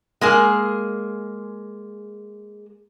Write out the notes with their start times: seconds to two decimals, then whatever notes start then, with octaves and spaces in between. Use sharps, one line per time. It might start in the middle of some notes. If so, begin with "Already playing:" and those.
0.21 G#3 A#3 G#4